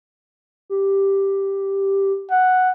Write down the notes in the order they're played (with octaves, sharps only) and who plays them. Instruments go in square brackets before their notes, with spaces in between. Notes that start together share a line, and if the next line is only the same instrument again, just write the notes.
[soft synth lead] G4
[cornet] F#5